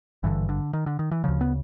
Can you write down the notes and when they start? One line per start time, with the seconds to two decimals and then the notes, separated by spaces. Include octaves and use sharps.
0.23 G#1 G2 D3 E3
0.49 D3
0.73 D#3
0.86 D3
0.99 D#3
1.11 E3
1.24 D2 C#3 F3
1.41 B3